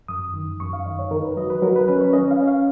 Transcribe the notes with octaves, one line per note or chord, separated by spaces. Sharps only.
F#2 D#6
D#3
F#2 C#6
F5
D#3 D#5
C#5
D#3 A#4
B4
F#3 D#5
B4
F#3 A#4
B4
C#4 B4
C#5
C#4 D#5
F5
C#4
F5